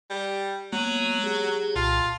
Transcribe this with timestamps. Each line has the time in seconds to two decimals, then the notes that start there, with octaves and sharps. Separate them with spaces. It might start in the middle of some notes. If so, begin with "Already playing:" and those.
0.10 G3
0.72 F#3 G#3 A#3 B3
1.24 G4 G#4
1.76 C2 A#2 F4 A5